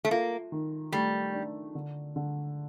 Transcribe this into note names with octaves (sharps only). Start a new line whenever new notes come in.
A3
A#3 F4
D#3
G3 A3
D4
D3
D3